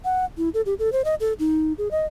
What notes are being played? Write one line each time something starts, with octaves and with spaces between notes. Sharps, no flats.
F#5
E4
A4
G4
A4
C5
D#5
A4
D#4
G#4
D#5